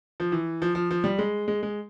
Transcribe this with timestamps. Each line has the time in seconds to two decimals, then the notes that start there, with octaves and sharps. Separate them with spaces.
0.20 F3
0.32 E3
0.62 F3
0.75 F3
0.91 F3
1.04 G3
1.19 G#3
1.48 G#3
1.63 G#3